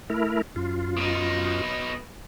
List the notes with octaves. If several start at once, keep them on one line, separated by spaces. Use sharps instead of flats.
A3 E4 A#4
F#2 F4
B2 D#4